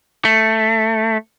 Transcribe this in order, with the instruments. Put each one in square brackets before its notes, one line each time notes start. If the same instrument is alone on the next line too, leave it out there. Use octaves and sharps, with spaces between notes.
[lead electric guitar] A3